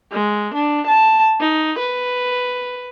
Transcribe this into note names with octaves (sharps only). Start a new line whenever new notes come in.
G#3
D4
A5
D#4
B4